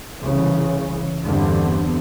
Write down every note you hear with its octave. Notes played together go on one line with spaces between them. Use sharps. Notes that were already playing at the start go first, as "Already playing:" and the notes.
C2 C#3 E3
E2 G2 D3 B3 C4